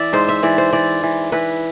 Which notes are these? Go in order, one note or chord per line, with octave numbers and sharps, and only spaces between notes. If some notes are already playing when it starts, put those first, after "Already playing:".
Already playing: E3 D5 E5
G#2 C5
E5
E3 D5
C5
E3 D5
E3
E3 B4